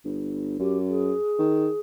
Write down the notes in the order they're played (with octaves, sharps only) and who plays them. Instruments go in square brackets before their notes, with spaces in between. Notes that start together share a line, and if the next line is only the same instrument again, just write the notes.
[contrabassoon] G1
[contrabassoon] F#2 [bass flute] G4
[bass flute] G#4
[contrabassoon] D#3